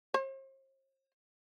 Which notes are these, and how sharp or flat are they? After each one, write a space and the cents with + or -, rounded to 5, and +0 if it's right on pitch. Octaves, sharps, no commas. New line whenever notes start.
C5 +45